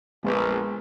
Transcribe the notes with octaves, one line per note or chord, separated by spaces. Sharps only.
A#1 G#3 B3